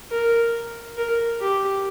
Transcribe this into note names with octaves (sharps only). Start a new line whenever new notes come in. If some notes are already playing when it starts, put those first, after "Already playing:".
A#4
A#4
G4